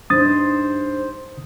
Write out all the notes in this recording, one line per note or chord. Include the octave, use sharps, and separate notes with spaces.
G2 D#4 C5 D#6 A6